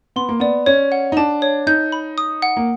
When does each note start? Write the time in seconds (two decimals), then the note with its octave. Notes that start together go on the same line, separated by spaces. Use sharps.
0.16 B3 C6
0.29 A#3
0.40 B3 D5
0.66 C#4 C#5
0.92 F#5
1.12 D#4
1.17 D4 A5
1.42 C#5
1.67 D#4 G6
1.92 B5
2.18 D#6
2.42 F#5
2.57 A#3